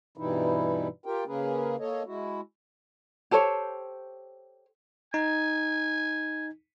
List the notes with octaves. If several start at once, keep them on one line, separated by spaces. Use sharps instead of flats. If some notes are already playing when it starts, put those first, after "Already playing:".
G2 B2 E3 G3 D#4 E4
F4 G4 A#4 G5
C#3 A#3 C#4 G#4 A#4 B4
A#3 A4 C#5 D#5
G#3 E4 F#4
G4 A4 C5 C#5
D#4 G#5